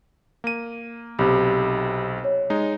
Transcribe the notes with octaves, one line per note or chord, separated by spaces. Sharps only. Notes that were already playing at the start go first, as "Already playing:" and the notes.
A#3 D#7
B1 C3 G4 B5
C#5
G#3 D#4